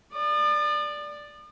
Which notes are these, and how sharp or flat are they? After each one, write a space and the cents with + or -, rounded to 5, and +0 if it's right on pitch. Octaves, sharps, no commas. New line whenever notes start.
D5 +0 D#6 -45